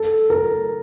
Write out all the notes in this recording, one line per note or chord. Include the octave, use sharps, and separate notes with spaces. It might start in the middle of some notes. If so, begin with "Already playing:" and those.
Already playing: A4
A#4